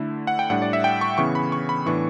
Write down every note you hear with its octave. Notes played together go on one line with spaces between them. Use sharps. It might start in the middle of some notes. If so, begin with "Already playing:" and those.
Already playing: D3 A3 E4
F#5
G5
A2 G3 D4 F#5
D5
E5
G5
C#6
C#3 E3 B3 E4 C#6
B5
C#6
B5
A2 E3 B3 D4 C#6